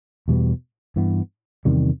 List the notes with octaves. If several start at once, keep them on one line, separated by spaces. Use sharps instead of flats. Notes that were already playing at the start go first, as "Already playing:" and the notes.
E2 B2 G3 B3
G2 E3 B3
E2 C3 D#3 G3